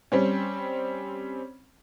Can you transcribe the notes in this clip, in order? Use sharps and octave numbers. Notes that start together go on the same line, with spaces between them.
G3 C4 C#4